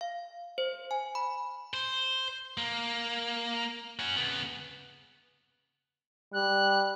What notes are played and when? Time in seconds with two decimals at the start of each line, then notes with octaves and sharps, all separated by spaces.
0.01 F5
0.58 C5
0.91 G#5
1.15 B5
1.74 C5
2.57 A#3
3.99 C#4 F#4
4.16 C#3 B3
6.33 G3 F#6